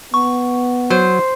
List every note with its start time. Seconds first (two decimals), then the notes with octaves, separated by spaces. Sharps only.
0.14 B3 C#6
0.90 F#3 C5